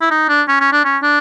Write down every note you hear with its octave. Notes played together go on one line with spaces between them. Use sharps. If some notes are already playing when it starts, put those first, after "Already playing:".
E4
D#4
D4
C#4
C#4
D4
C#4
D4